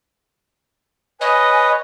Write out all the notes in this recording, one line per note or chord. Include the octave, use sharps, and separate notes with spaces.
B4 C#5 D#5 G#5